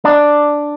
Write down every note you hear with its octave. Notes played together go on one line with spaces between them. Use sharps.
D4